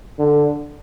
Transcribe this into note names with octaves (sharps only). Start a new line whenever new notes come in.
D3